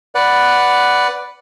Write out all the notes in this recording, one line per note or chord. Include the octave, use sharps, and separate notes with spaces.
B4 D5 F#5